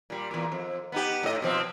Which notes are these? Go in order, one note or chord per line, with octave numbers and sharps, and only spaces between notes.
A#2 G3
E2 A#2
F2
B3 D#4 G4
A2 D#5
B2 F3 C4